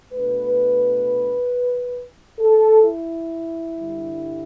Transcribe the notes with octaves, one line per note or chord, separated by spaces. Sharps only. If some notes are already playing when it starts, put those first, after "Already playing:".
B2 A3 D4 B4
A4
E4
G2 D3 G3